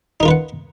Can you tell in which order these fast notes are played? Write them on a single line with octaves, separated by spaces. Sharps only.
D#4 A#4 F4 B4 F#5